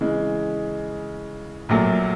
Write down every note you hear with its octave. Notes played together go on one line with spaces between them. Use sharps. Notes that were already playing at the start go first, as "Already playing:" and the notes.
C#3 E3 G#3
A#1 A#2 F#3 A3